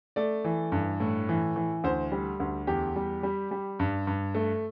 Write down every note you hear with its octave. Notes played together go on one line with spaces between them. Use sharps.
A3 D5
E3
G2
A2
E3
E3
D2 C5
G3
D2
E2 G4
G3
G3
G3
G2
G2
A3